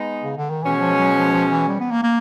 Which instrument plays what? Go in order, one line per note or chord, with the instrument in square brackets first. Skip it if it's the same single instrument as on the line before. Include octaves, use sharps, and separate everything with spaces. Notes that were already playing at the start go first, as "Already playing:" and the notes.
Already playing: [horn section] G#3 B3 D#4
[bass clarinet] C#3
D3
D#3
[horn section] B2 G#3 C#4 [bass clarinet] E3
[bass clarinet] F3
F#3
F3
F3
E3
G3
B3
A#3
A#3